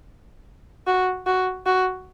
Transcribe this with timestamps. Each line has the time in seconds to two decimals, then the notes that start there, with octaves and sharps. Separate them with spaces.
0.87 F#4
1.26 F#4
1.66 F#4